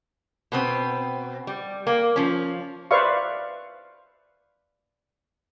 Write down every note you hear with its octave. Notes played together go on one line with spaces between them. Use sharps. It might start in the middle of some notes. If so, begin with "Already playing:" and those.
B2 B3 C4
G3
A#3
F3 C#4
B4 C5 D5 E5 F5 C#6